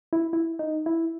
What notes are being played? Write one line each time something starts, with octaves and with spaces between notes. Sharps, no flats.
E4
E4
D#4
E4